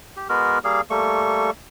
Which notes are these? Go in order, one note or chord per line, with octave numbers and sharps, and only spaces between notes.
G4
G#3 B3 F#4 A#4
G3 A#3 G#4 F5
G3 A3 A#3 C#6